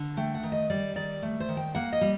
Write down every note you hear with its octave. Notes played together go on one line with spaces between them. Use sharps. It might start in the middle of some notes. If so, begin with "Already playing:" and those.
Already playing: D3
A3 G5
F#5
D#3
D#5
G3 D5
D#3 D5
A3
C5
D#3
G5
A#3 F#5
D#5
G3